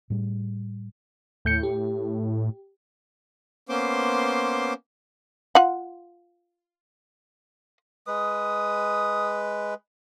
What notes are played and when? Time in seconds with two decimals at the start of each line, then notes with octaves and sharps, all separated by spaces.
0.10 A2 G3
1.45 D#2 A2 G6 C#7
1.63 G4
3.69 A#3 B3 C#4 C5 C6 D6
5.55 F4 F#5
8.07 G#3 B4 D#6